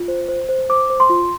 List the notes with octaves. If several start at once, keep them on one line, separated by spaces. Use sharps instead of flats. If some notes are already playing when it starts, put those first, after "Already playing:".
Already playing: F4
C5
C5
C5
C5 D6
C5
C6
F4